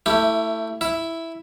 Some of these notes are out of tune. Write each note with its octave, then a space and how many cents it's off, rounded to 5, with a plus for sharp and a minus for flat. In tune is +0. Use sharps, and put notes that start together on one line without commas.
A3 +20 E4 +0 G4 +0
E4 +0 E5 +0